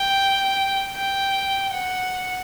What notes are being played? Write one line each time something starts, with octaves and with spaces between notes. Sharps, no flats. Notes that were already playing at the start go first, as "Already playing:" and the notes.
Already playing: G5
G5
F#5